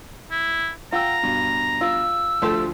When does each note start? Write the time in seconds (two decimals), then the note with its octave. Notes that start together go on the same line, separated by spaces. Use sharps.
0.31 E4
0.92 F4 F#5 G5 A#5 E6
1.23 G2 B2
1.81 F4 E6
2.42 D2 F3 A3 G4 A4 C6